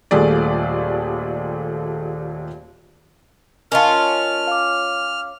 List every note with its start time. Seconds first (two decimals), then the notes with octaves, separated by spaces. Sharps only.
0.11 D#1 D#2 A#2 A3 G#4 D5
3.72 C#4 D#4 F4 A#4 D#5 A5 F6
4.47 F5 D6